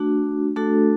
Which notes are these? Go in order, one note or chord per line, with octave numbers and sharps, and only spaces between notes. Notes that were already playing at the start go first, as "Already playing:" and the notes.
Already playing: A3 D4 F#4
A3 D4 F#4 A4